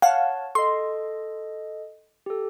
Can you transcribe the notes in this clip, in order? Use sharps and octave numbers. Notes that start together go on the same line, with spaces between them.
C#5 F5 F#5 A5
A4 D#5 C6
G4 A4